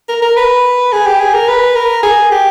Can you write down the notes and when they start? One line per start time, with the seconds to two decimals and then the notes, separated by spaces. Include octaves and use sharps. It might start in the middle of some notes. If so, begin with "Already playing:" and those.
0.09 A#4
0.22 A#4
0.36 B4
0.92 G#4
1.06 G4
1.20 G#4
1.34 A#4
1.48 B4
1.76 A#4
2.03 G#4
2.31 G4